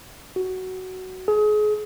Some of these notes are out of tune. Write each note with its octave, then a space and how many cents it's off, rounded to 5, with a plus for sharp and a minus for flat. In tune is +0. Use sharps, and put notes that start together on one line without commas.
F#4 +10
G#4 +30